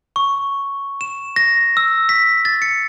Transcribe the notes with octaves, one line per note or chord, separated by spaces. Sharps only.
C#6
E7
A#6
E6
B6
A6
C#7